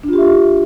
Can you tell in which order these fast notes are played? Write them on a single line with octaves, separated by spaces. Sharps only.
D4 F4 G4 E5